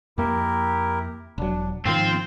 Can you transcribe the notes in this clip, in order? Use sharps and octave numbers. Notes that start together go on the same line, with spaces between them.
F2 A#3 E4 G4 A#4
E1 F#3 D4
G#2 D#3 F3 C4 F4